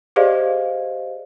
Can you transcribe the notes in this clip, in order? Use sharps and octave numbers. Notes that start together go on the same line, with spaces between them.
G4 G#4 C5 D5 D#5 F5